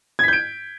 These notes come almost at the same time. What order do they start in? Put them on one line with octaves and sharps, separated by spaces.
G#6 B6 G6 D7